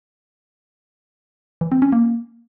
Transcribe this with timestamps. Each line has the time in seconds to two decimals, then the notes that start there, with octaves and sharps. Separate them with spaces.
1.61 E3
1.72 C4
1.82 C#4
1.92 A#3